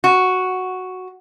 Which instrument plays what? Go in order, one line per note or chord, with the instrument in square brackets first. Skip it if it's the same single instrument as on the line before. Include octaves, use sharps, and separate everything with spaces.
[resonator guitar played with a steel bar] F#4